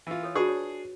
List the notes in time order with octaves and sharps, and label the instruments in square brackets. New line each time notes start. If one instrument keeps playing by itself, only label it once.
[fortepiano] E3 F4
[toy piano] A4 C#5
[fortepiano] D4 G#4 C#6 [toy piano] F4 F#4 B4
[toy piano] C#5